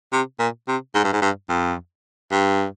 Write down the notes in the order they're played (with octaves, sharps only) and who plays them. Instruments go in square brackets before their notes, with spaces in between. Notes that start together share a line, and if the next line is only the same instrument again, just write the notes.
[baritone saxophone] C3
A#2
C3
G#2
G2
G#2
G2
F2
G2